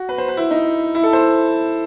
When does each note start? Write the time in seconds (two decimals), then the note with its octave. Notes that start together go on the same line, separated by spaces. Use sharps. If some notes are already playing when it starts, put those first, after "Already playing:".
Already playing: F#4
0.09 B4
0.18 C5
0.28 B4
0.37 E4
0.51 D#4
0.95 E4
1.03 A4
1.13 C5